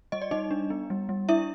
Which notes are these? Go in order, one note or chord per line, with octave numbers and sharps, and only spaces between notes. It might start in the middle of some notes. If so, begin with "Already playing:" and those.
G3 D#5
D5
G3 D#4 D#5
D4
B3
G3
G3
D4 E4 E5